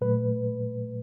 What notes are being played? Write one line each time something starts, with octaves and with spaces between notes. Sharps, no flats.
A#2 F#3 A3 B4